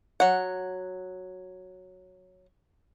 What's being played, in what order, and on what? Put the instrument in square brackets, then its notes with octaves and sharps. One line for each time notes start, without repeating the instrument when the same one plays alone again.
[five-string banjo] F#3 F#5